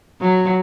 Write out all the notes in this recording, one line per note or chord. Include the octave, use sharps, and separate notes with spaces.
F#3